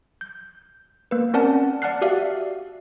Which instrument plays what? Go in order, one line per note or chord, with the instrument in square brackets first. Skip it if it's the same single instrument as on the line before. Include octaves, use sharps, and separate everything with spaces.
[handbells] G6
A#3 B4
C4 C#4 A#4 D5 F#5 A5
D5 F#5 A5 F6 F#6 C7
F#4 G4 D5 E5 F5